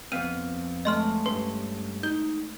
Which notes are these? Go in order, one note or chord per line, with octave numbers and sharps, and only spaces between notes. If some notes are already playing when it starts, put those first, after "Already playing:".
F2 B3 C4 F5 D#7
G#3 A3 C#5 D#5 C6 F6
G2 C#4 B4 C6
D#4 G6 G7